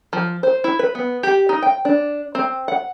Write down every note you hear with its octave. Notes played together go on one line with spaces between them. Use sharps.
F3
C5
E4
B4
B3
G4
D#4
G5
D4
C4
F#5